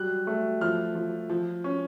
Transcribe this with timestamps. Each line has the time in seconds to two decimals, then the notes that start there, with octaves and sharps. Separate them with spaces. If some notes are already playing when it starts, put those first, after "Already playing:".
Already playing: F#3 G3 F#6
0.27 A3
0.61 F3 F6
0.95 F3
1.29 F3
1.64 C#4